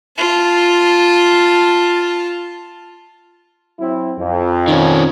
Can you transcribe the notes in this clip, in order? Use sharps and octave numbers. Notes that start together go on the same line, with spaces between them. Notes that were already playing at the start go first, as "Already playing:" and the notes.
F4 A5
F#3 C4 E4
F2
D#3 C#4